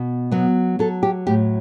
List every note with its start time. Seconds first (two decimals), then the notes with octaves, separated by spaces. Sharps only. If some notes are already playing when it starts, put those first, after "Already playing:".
Already playing: B2
0.31 F#3 B3
0.79 F#3 A4
1.03 G4
1.27 A2 G4